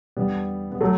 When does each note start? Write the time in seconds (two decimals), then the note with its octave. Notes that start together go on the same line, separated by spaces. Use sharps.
0.17 E2 D3 G3 B3
0.72 B3
0.81 F#3 A3